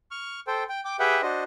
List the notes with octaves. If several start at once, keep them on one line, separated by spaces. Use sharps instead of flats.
C#6 F6
A4 C5 G5
G5
G5 D6
G4 G#4 B4 E5 F#5 G5
D4 F#4 C5 D#5